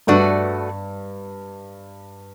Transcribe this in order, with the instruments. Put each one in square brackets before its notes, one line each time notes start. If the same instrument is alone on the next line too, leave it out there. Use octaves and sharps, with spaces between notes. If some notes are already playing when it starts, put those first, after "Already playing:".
[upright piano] G2 [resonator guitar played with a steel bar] A3 D4 F#4 B4